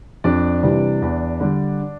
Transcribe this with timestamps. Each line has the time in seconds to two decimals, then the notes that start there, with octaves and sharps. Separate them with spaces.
0.24 F2 D4 D5
0.63 C3 E3 G3
1.02 E2
1.40 D3 G3